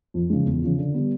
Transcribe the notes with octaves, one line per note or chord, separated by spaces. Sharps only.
F2
C#3 F3 G#3
E2
C#3 F3
D3
G3 B3